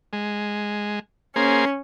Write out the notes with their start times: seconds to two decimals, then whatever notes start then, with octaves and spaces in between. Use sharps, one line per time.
0.13 G#3
1.36 A#3 C#4 G#4 C5